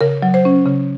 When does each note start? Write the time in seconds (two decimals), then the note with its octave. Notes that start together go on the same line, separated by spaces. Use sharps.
0.01 C#3 A#4
0.22 F#3
0.34 C5
0.45 C#4
0.66 C#3